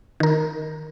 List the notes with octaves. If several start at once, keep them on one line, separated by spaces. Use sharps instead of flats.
D#3 A#4